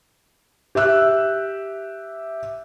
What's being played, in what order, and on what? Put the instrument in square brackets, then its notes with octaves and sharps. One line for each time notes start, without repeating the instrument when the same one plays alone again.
[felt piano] G4 E5 E6 F#6